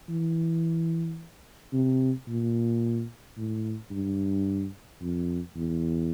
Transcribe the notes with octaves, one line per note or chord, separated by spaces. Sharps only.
E3
C3
A#2
A2
G2
F2
E2